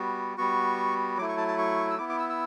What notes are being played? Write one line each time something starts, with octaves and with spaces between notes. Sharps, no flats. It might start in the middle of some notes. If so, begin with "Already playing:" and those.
Already playing: G3 B3 F#4
G3 B3 F#4 C#6
F#3 A3 E4 D6
C#6
A5
A5
C#6
E6
B3 E4 D6
D6
E6
E6